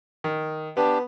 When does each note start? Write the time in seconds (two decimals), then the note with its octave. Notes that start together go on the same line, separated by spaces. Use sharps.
0.24 D#3
0.77 B3 D4 G4